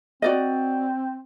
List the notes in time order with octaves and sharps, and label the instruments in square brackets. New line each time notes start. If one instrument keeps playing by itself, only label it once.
[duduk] C4 [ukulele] F#4 D5 D#5